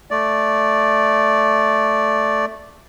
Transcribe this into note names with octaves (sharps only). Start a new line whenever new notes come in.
A3 D5